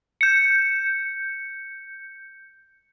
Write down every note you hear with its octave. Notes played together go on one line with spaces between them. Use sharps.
G6 C#7